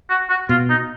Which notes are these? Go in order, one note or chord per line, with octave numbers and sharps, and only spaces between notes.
F#4
F#4
B2 F4
D#4